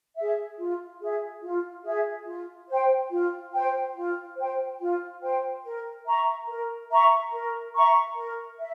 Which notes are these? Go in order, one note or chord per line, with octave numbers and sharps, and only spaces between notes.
G#4 E5
F4
G#4 E5
F4
G#4 E5
F4
C5 G5
F4
C5 G5
F4
C5 G5
F4
C5 G5
A#4
E5 A#5 C#6
A#4
E5 A#5 C#6
A#4
E5 A#5 C#6
A#4
E5